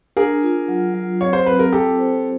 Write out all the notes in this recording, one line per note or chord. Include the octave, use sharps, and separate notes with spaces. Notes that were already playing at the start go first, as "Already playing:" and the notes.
D4 G#4 A#4
F4
F#3
F#3
C4 C#5
C5
C4 B4
A#4
F4 G4 A4
C5